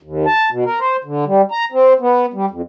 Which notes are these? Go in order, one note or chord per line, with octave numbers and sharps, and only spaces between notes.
D#2
A5
B2
A#4
C5
D3
G3
A#5
C4
B3
G3
F2